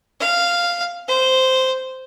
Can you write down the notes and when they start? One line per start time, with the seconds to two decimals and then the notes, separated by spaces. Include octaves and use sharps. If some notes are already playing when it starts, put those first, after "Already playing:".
0.20 F5
1.08 C5